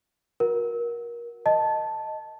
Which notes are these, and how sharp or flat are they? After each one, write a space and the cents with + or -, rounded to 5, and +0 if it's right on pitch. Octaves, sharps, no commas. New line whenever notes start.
F#4 -35 A#4 +25 F#5 +0
D#5 +0 A5 +0